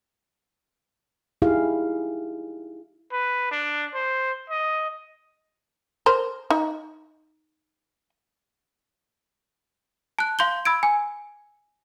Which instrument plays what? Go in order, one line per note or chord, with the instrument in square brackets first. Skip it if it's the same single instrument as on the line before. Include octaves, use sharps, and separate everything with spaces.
[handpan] D#4 E4 G4 G#4 F5
[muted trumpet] B4
D4
C5
D#5
[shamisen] A#4 C5
D#4
[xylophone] A5 F#6
F5 C6 G6 G7
B5 E6 G#6 D7
G#5